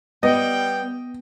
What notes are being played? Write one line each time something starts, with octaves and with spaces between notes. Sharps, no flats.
G3 B3 D#5 G5